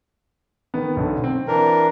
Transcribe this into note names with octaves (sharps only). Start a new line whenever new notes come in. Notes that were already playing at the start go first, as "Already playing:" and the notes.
D#3 B3
B1 D3
C4
E3 D4 A#4